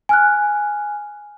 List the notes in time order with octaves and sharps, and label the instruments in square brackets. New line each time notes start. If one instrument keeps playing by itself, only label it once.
[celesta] G#5 F6 F#6